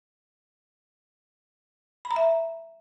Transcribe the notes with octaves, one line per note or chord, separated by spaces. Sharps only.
B5
A#5
E5